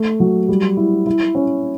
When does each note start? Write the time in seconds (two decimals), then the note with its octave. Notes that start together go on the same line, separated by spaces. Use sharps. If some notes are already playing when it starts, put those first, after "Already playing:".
Already playing: A3
0.20 F#3
0.49 G3
0.77 E4
1.07 E4
1.35 C#4